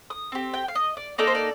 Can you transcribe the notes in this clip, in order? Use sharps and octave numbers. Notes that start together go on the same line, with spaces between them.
D#6
C4 G4
G5
F5
D#5
D5
A#3 D#4 A4 D5
C5
D5